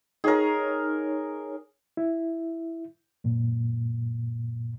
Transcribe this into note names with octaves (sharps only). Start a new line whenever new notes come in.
D#4 G#4 A#4 C#5
E4
F#2 A#2